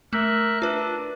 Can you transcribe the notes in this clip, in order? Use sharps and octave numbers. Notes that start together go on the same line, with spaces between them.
A3 A#4 E5 F#6
D4 F4 B4